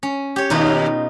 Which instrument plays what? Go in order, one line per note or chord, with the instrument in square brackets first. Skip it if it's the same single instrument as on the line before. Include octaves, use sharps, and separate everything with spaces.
[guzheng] C#4
G4 C#5
[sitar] D#2 [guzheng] B2 D#4 F4